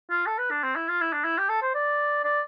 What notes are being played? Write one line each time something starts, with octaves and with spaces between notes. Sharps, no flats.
F4
A4
B4
D4
C4
E4
F4
E4
D4
E4
G4
A4
C5
D5
D5